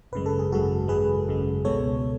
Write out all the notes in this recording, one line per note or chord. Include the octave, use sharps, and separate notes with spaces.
G#1 F#2 C#3 G#3 B4
A4
G#4
G#1 F#2 C#3 G#3 F#4 A4
G#1 F#2 C#3 G#3 G#4 B4
G#1 F#2 C#3 G#3
C#2 B2 G#3 B3 A4 C#5